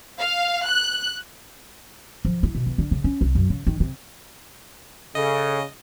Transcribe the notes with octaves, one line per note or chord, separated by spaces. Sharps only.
F5
F#6
F3
E4
B2
E2
D3
C#3
C#4
C2
F#2
C#3
D#3
C3
C#3 A4 D#5